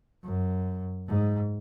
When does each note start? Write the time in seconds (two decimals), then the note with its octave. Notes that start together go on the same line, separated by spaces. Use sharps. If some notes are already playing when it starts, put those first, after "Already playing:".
0.24 F#2
1.08 G#2